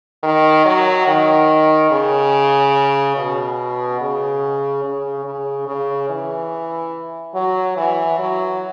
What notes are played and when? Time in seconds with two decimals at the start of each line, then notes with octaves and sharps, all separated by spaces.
0.23 D#3
0.65 F#3
1.08 D#3
1.91 C#3
3.16 B2
4.01 C#3
4.84 C#3
5.25 C#3
5.68 C#3
6.10 E3
7.35 F#3
7.77 E3
8.19 F#3